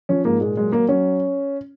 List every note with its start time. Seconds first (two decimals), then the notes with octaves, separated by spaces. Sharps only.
0.09 F3 C#4
0.25 G#2 A#3
0.41 A#2 G#3
0.57 F#3 G#3
0.72 F#3 A#3
0.88 F#3 C#4